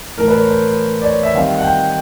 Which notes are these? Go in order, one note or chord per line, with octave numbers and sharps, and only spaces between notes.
A2 E3 A3 A#4
B4
C#5
C5
D5
C#5
E5
D#3 G3 C4 F5
F#5
G5